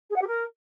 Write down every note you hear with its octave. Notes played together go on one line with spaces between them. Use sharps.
G#4
F#5
G4
A#4